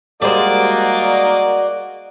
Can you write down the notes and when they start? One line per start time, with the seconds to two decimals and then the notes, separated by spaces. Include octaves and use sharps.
0.22 G3 G#3 A#3 F#4 C5 D5 D#5